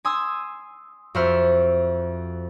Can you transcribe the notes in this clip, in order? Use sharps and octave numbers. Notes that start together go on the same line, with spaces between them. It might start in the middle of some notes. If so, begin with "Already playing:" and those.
G#5 C6 D#6 E6
F2 F#4 C5 E5 F6